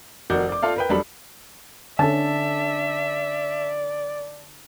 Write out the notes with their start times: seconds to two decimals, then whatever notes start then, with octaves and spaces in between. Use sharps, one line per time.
0.30 F1 D#3 F#4 A#4 D5 G6
0.49 D5 D6
0.62 F4 A4 D5 F5
0.76 A#4 B4 G5
0.89 F1 F#3 G3 D4 A4 B5
1.99 D3 C#4 A4 D5 E5 A5